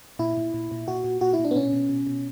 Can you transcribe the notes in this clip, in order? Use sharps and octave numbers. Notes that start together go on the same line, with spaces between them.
A#2 E4
A#2
A#2
A#2
A#2 F#4
A#2
A#2 F#4
E4
A#2
D4
B3
B2 C#4
B2
B2
B2